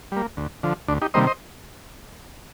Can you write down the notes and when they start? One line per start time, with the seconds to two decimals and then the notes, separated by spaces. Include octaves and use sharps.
0.12 G3 A#3
0.37 D2
0.63 D3 F3
0.88 D2 D4
1.02 D#4 G4
1.14 C3 D#3 G3 A#3 C5 D#5
1.27 C5 D#5